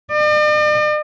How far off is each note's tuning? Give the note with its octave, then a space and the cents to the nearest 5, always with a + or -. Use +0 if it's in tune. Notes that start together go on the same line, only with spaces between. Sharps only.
D5 +45